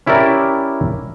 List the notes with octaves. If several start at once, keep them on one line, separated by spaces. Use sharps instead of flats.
C#4 E4 G4 A#4 D5